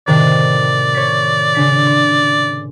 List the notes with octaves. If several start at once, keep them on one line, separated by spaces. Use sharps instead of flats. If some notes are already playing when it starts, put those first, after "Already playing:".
A2 C3 D#3 D5
C#5 B6
C#3 D4 B6
C6